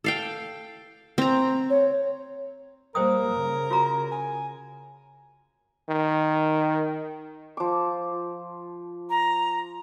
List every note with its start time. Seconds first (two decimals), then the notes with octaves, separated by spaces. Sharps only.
0.04 A4 F5 G5
1.18 C4 A#5
1.70 C#5
2.95 G3 A#3 A#4 C5 G5 D#6
3.33 C#3
3.71 F4 F#4 A#5
4.12 G#5
5.89 D#3
7.57 F3 D6
9.10 A#5